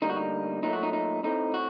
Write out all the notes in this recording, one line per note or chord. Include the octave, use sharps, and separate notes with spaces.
D2 D3 G3 A#3 D#4
F#4
D#4
A#2 F#3 A3 D#4
F#4
D#4
D#4
A2 A3 C4 D#4
F#4